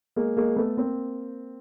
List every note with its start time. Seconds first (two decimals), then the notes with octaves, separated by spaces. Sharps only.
0.16 G#3 A#3
0.37 G#3 A#3
0.56 A3 B3
0.77 A#3 C4